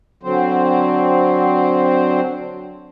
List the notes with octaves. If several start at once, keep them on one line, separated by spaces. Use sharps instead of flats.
D3 F#3 C4 C5